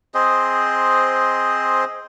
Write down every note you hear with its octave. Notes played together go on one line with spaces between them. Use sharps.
C4 G#4 C5 D#5